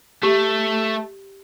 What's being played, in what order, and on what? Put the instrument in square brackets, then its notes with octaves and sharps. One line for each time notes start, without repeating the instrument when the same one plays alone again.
[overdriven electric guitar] A3 [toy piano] G4